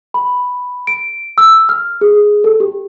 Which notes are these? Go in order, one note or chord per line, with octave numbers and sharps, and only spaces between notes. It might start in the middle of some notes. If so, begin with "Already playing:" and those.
B5
D7
E6
F6
G#4
A4
G4